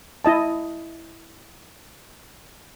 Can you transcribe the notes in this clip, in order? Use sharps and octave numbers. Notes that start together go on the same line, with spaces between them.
E4 D#5 A5